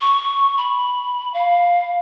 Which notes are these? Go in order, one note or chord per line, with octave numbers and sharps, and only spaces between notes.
C#6
B5
F5